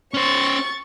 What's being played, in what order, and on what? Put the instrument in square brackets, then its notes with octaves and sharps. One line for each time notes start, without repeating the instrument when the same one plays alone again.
[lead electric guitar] C#4 C5 [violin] C#6 A6